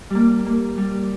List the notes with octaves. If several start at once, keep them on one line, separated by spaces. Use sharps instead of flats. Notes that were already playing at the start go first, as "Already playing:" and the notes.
G3 A#3
A#3
G3